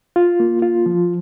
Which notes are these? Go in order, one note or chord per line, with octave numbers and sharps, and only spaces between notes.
F4
A#3
F4
F3